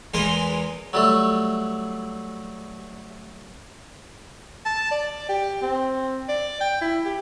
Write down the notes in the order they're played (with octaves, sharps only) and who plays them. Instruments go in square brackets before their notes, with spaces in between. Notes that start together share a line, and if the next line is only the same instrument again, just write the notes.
[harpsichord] E2 E3 G#3 A#4 B4 C6
F#3 G3 A3
[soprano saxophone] A5
D5
G4
C4
D5
G5
E4
G4